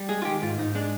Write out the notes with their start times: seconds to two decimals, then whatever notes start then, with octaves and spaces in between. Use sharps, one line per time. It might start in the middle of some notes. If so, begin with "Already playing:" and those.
Already playing: G3
0.09 G#3 G#4
0.22 F4
0.25 D#3 G4
0.42 G#2 F4
0.58 G#2 D#4
0.75 G#3 D4